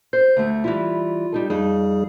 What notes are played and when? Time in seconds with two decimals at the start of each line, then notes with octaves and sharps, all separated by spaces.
0.13 C5 G6
0.36 D2 A3
0.64 E3 G3 E4 F4
1.32 G3 D#4 A4
1.50 F2 G3 D#4 G#4